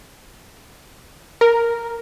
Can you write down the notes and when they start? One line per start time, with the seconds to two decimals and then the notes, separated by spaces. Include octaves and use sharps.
1.41 A#4